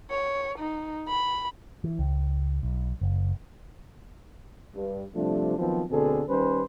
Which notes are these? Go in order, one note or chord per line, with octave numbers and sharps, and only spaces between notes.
C#5
D#4
B5
E3
C#2
B1
F#1
G2
C3 F3 G3 A3 D4
D#3 F3 F#3 B3 C4
D2 B2 D3 C4 G#4 A4
D#3 G3 C#4 B4 C5